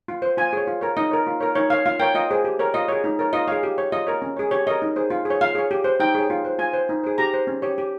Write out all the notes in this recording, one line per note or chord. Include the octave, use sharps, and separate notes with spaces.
F4
C5
F4 G#5
G#4 C#5
F4
A#4 C#5
D#4 D#5
A#4 C#5
F4
A#4 C#5
D#4 C#5
A#4 C#5 F5
F4 F5
A#4 C#5 G5
F4 D#5
G#4 C5
G4
A#4 C#5
F4 D#5
G#4 C#5
D#4
A#4 C#5
F4 D#5
G#4 C#5 F5
G4
C#5
F4 D#5
A#4 C#5
C#4
G#4 C#5
G4 C#5
A#4 C#5 D#5
D#4
G#4 C5
F4
G#4
C#5
F4 F5
G#4 C#5
G4
C5
D#4 G5
G#4 C#5
F4
C5
F4 G#5
C5
D#4
G#4 C5
G4 A#5
C5
C#4
G4 C#5
G4